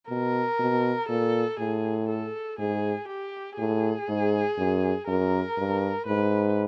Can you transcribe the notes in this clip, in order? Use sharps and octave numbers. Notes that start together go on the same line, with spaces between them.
B2 A#4
B2
A#2 A4
A2 G#4
A4
G#2 G#4
G4
A2 G#4
G#2
F#2
F#2 A#4
G2
G#2 B4